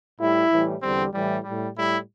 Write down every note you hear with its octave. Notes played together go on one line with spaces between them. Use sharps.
A2 G3 E4
A2 E3 G3
E2 D3 G3 C4
A2 E3 G3
A2 G3
A2 G3 E4